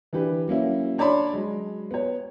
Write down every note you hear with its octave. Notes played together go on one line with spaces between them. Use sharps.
E3 D4 G4 B4
F#3 A#3 C#4 E4
D4 C#5 D5 A5 B5 C6
F#3 G#3
B3 C#5